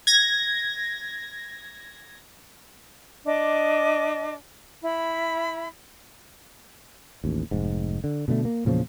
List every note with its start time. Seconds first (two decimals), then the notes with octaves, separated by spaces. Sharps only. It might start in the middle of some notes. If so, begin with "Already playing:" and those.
0.07 G#6 A#6
3.25 D4 D#5 D6
4.82 E4 B5
7.24 A1 D#2
7.51 F1 G#2
8.04 D3
8.28 B2 D3 F3 A3
8.45 A#3
8.65 E2 A#2 C#3 F3